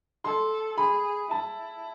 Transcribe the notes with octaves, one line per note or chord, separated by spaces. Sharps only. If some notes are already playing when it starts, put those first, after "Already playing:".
A4 C6
G#4 B5
E4 A5